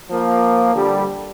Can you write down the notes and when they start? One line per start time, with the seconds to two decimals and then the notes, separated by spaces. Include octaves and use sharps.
0.10 F3 A#3
0.74 D3 G3